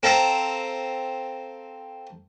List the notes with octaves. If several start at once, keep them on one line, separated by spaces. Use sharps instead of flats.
C4 A4 F5 A#5